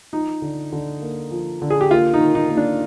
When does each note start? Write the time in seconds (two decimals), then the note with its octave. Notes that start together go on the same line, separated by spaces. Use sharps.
0.12 F3 D#4
0.42 D3
0.73 D3
1.02 A#3
1.31 F3
1.62 D3
1.70 G#4
1.81 G4
1.91 A#3 F4
2.14 D#4
2.20 D#3
2.35 D#4
2.50 A#3
2.57 D4